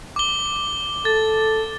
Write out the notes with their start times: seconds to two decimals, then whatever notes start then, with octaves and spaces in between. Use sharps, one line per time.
0.16 D6 G7
1.05 A4 A6